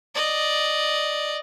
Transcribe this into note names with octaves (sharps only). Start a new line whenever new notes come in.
D5 D#5